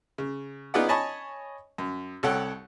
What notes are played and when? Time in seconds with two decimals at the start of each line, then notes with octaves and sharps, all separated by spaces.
0.18 C#3
0.74 B3 D#4 F4 G#4 D5 F#5
0.89 C#5 D#5 G#5 A5 B5 C#6
1.78 F#2
2.23 C2 A4 C#5 F#5 G5